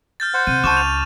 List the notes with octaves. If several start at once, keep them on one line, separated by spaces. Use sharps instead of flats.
F6 G6 A6
C5 F#5
C3 D#7
C#2 A5 C#6 D6 D#7 E7
F7